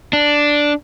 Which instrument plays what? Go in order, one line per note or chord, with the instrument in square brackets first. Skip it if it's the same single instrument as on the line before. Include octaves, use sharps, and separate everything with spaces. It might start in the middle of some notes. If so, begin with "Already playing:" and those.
[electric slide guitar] D4